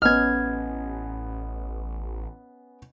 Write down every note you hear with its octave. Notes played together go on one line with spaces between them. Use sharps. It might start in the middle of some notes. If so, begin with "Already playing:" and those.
A1 B3 C#4 D#5 F6 G#6